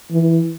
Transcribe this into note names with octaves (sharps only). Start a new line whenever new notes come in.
E3